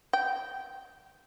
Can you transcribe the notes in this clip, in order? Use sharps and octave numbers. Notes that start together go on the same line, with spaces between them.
G5